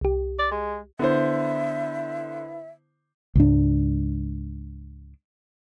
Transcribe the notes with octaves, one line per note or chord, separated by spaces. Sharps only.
C2 G4
D5
G#3
D3 B3 E4 C5 E5
C#2 G#2 D4